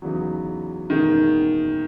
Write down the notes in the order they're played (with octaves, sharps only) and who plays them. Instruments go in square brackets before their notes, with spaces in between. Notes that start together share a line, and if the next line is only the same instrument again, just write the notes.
[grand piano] E2 C#3 E3 B3 D#4 [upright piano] F#3
[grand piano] F#1 E2 B2 G#3 D#4 [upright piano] D#3